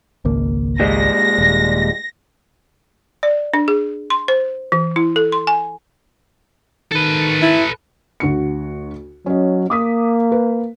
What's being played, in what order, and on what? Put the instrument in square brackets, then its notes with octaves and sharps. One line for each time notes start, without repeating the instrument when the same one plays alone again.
[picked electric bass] G#1 C#2 A#3
[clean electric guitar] A#2 G3 G#3 [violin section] A#6
[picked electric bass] D#1
[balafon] D5
D4
G#4
C6
C5
E3
E4
A4
C6
G#5
[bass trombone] D#3 [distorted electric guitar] A4 B4
[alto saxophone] E4
[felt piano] D2 F#4 C#7
[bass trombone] F#3 [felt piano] C#4 D#5
[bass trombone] A#3 [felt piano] D6 D#6 B6
[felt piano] B4